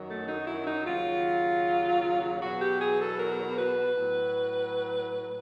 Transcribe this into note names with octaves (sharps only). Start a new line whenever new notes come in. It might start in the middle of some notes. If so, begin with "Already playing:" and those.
Already playing: F#2 D#3 F#3
A3
D#4
E4
D#4
D#2 C#3 F#3 F4
E2 B2 F#3 F#4
G4
G#4
A4
A#4
B4
A2 F#3